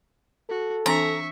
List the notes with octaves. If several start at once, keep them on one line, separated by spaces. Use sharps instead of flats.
F#4 A4
E3 C4 D4 E5 A#5 C#6